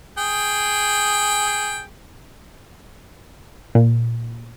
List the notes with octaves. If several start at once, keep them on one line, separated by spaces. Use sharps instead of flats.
G#4 G5
A#2